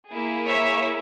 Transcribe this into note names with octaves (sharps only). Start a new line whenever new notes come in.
A#3 E4 G#4
C#5 E5